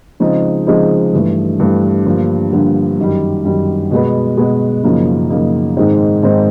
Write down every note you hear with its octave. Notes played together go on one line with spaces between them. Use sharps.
C#3 F3 G#3 C4 D#4
C#3 F3 G#3 C4 D#4
G2 E3 A3
G2 E3 A3
G2 D3 F3 A#3
G2 D3 F3 A#3
F#2 D#3 G3
F#2 D#3 G3
B2 G#3 B3
B2 G#3 B3
F#2 C#3 F3 A#3 D#4
F#2 C#3 F3 A#3 D#4
G#2 D#3 G#3 C4 D#4
G#2 D#3 G#3 C4 D#4